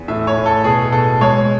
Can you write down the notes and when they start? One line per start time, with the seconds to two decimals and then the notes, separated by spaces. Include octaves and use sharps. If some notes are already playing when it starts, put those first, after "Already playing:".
Already playing: E2
0.08 A2 E5
0.27 C#5
0.37 A2
0.46 A4
0.64 B2 G#4
0.92 B2 A4
1.21 G#3 C#5